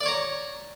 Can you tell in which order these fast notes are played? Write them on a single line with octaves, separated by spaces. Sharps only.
D5 D6 C#5 A#5